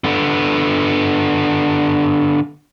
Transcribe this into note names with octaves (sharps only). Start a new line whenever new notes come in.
D3 B3